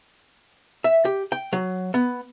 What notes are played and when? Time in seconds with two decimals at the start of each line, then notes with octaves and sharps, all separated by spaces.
0.84 E5
1.05 G4
1.32 G5
1.53 F#3
1.94 B3